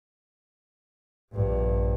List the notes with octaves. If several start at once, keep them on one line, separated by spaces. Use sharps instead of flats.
A#1 G2